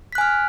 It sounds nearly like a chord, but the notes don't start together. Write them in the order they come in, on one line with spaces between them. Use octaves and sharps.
B6 F#6 G#5 F6